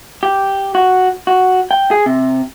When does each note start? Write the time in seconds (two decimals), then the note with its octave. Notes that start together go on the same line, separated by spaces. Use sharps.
0.23 G4
0.75 F#4
1.27 F#4
1.71 G5
1.91 G#4
2.06 C3